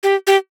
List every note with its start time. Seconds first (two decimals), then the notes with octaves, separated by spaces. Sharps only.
0.03 G4
0.27 G4